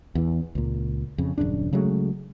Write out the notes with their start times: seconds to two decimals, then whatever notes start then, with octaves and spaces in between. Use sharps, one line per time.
0.15 E2 E3
0.55 C#2 A#2
1.18 F2 C#3
1.38 D#1 F#2 C#3 D4
1.73 C#3 F#3 G#3 A3